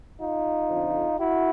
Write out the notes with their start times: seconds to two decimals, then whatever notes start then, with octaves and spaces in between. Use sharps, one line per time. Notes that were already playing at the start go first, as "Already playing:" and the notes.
0.20 D#4 F4
0.69 F2 D3 F3
1.19 E4 F#4